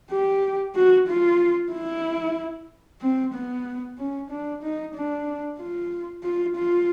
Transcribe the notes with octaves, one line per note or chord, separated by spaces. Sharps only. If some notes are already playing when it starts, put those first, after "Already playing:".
G4
F#4
F4
E4
C4
B3
C#4
D4
D#4
D4
F4
F4
F4